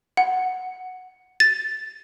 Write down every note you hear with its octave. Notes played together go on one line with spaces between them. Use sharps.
F#5
A6